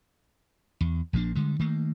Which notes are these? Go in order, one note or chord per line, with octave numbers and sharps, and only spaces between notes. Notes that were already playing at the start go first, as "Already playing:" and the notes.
E2
A#1 F3 A#3 D4
D3 G3 G#3
D#3 A3 A#3